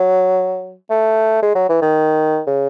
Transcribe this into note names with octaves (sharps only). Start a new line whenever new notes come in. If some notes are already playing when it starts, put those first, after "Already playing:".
Already playing: F#3
A3
G#3
F#3
E3
D#3
C#3